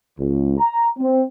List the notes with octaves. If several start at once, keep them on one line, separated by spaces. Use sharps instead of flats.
C#2
A#5
C4